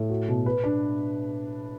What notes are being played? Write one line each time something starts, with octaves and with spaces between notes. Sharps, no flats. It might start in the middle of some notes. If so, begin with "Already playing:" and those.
Already playing: A2
F#4
B2
B4
D4